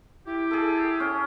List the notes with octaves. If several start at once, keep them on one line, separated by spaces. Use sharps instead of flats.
E4 G4
G#4 A4
C#4